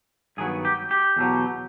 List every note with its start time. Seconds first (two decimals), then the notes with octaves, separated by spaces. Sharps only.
0.37 G2 D#3 F#3 B3 G#4
0.65 G4
0.91 G4
1.16 E2 B2 F#3